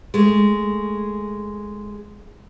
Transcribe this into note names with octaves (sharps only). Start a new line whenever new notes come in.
G#3 A3